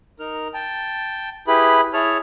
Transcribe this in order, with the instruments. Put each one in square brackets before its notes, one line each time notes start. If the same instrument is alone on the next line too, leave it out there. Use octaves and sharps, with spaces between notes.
[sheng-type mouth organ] D#4 A#4 F6
G5 A5
E4 G4 G#4 B4 B5
E4 G#4 C#5 A5 F6